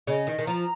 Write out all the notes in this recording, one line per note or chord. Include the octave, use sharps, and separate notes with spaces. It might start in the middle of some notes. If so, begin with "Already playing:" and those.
C#3 D#5
D#3
D#3
F3 A#5